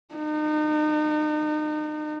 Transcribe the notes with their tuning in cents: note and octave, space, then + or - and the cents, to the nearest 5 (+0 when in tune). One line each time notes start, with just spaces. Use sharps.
D#4 -35